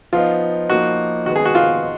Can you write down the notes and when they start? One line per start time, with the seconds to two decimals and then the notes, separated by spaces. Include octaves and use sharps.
0.13 F3 B3 D#4 F4
0.69 F3 A#3 D#4 F#4
1.26 D#3 G#3 B3 F#4
1.36 G#4
1.45 F#4
1.55 F4
1.83 D#4